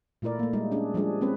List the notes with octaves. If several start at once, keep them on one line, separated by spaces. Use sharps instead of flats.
A#2 A3 E4 A#4 D5
A3 A#3
G3 G#3 D#4
C#4 D4 G#4
F3 G3 G#3 D4 G#4
G#3 C4 C#4 B4